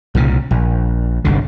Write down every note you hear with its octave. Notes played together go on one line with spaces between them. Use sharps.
C2 A#2 C#3
A#1
G1 C2 D3